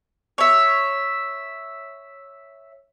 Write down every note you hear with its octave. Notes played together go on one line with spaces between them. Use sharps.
C#5 E5